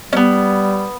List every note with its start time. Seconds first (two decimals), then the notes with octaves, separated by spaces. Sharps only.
0.13 G3 B3 C#4